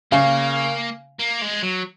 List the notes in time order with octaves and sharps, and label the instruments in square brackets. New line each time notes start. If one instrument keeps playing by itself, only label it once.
[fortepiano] C#3 [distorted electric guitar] A#3
[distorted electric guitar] A#3
G#3
F#3